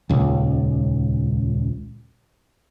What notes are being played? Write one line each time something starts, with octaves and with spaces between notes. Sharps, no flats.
D#1 C#2